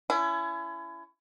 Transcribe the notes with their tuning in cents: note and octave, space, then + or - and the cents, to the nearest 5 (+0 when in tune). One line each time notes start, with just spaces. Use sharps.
C#4 +25 E4 +30